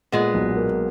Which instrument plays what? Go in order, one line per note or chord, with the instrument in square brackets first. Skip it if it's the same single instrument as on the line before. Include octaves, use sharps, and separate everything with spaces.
[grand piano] A#2 [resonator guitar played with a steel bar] G#3 B3
[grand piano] B1
A#3